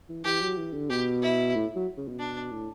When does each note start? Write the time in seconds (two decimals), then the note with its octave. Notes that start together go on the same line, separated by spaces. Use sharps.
0.09 E3
0.24 E3 G4
0.41 F#3
0.57 E3
0.73 D3
0.90 B2 G4
1.22 E4
1.55 A2
1.75 F#3
1.97 C#3
2.08 B2
2.19 D4
2.51 A2